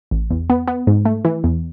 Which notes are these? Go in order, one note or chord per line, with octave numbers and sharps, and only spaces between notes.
A1
E2
B3
B3
G#2
A3
E3
E2